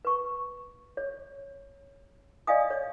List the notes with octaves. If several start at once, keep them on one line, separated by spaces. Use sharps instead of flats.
B4 C#6
C#5
D5 D#5 F5 G#5 D#6
C#5